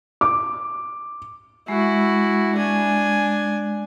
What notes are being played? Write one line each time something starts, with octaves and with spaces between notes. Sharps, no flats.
D6
G#3 E4 F#4
D4 G#5